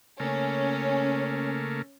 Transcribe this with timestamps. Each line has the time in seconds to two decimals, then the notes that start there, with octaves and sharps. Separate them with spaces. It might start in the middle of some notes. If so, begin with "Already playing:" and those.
0.20 C#3 A3 A#3 C#4